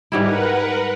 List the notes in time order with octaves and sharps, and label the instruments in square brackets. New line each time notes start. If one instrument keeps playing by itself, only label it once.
[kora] G#2 G3 E4 [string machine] A#4 B4 F#5